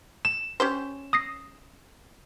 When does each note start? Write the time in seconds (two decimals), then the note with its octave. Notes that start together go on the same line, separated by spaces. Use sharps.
0.25 E7
0.60 C#4 G4 C5
1.13 D#6 A#6 C7